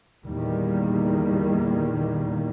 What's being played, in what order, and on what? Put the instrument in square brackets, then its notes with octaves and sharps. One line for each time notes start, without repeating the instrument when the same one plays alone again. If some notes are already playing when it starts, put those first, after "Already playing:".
[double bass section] E2 A#2 D#3 G3 A#3